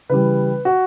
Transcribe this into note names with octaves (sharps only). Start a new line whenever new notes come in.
C#3 E3 G3 B4
F#4